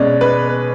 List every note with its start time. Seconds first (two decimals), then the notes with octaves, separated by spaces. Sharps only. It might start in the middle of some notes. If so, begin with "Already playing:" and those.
Already playing: B2 G#3 C#4 D5
0.21 B4